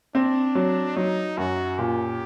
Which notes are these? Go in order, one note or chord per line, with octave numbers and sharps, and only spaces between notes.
C4 D4
F#3
F#3 D#4
F#2 F#4
A#2 G4